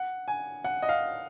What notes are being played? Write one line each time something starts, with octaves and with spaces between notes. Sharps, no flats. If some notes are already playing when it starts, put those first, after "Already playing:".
Already playing: F#5
G#5
F#5
D#5
F5